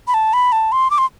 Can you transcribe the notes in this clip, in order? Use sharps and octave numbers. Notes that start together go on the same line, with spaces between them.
B5
A5
B5
A5
C6
D6
C6